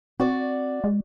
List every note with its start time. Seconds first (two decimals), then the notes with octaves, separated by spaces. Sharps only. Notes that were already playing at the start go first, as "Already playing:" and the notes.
0.20 C4 F#4 D5
0.84 G#3